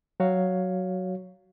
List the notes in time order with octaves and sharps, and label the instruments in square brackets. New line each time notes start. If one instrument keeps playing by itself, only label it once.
[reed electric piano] F#3 F#4 C#5 F5